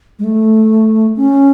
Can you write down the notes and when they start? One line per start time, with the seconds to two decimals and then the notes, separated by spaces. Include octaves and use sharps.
0.19 G#3
0.24 A3
1.16 C#4